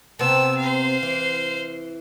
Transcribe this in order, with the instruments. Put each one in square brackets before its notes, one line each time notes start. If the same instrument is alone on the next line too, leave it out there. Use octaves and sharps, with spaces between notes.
[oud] C3 B3 C4 [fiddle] A5 E6
[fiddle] C5 F5
[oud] E3